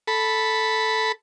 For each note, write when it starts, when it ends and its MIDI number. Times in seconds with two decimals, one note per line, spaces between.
0.08 1.12 69
0.08 1.12 83